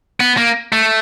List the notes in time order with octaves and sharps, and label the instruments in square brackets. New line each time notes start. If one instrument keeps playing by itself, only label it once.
[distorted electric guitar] B3
A#3
A3